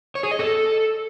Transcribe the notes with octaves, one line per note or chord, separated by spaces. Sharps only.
C#5
G#4
D#5
A4